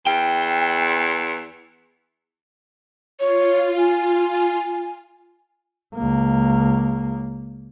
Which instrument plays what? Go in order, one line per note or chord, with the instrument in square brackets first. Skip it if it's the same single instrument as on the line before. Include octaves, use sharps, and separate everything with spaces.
[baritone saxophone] E2 [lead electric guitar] G5
[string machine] F4 [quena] C#5
[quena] G#5
[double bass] C#2 A#3